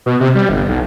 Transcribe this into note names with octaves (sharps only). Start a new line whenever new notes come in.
B2
C3
G3
G1
B1